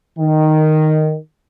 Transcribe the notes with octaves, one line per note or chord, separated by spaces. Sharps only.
D#3